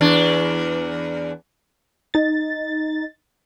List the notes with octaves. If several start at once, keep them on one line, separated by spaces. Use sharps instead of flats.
E2 D4
D#4 A6